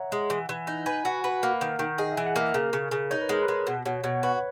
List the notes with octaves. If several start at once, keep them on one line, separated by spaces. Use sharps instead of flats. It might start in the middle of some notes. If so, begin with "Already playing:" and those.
Already playing: C#5 E5 F#5 A#5
G#3
E3
E3
D#4
B4 G#5
F#4
B4
A#3 F#5
D#3
D#3
G#4 D#5
E5
E3
F#5
A#3
E5
C#3 A#4
C#3
C#3
D#4 C#5
B4
G#3 A#4
B4
G#3
B2
B2 C#5
B2 C#5
F#4 B4